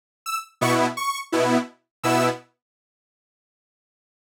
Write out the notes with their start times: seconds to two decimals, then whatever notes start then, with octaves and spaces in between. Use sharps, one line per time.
0.26 E6
0.61 B2 B3 E4 C#6
0.97 C#6
1.32 B2 B3 E4
2.03 B2 B3 E4 E6